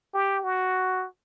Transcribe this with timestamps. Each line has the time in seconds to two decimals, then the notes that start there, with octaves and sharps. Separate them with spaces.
0.14 G4
0.44 F#4